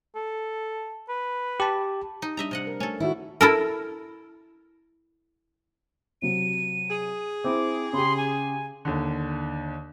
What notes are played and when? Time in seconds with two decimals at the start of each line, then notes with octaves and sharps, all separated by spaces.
0.16 A4
1.09 B4
1.60 G4 A5
2.22 D#4
2.37 G3 D4 D#5 E5 A#5
2.51 C3 D#5 F#5
2.67 A#4
2.80 A3 C#4 A4
3.00 D#3 E4 F#4 C#5 E6
3.41 E4 A4 A#4
6.22 C3 F#3 D#7
6.90 G#4
7.44 C4 E4 D6
7.93 C#3 G4 C6
8.17 G#5
8.85 D#2 D3